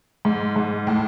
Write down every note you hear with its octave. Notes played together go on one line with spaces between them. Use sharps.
G#2
G#2
A2